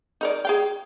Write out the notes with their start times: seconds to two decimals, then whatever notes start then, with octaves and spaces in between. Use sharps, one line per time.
0.21 D#4 A#4 D5
0.45 G#4 F5 G5